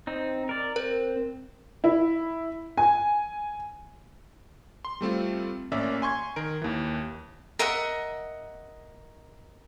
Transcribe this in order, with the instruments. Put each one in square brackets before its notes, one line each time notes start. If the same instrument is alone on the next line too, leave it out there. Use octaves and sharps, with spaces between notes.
[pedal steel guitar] C4 D#4
A#4 D5
[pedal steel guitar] C4 [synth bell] A#4
[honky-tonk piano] E4
G#5
[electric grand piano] C6
G3 A3 C4 F4
A1 A#3 C#4 D5 E5
G#5 C6 C#6 G#6
D#3 A#4 D7
D#2 E3
[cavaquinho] A#4 D#5 E5 F#5